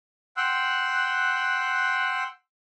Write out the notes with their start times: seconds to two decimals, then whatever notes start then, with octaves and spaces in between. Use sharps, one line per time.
0.37 F#5 G5 C6 E6 F#6